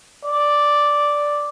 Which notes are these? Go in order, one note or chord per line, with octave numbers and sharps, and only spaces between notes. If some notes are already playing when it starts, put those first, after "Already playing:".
D5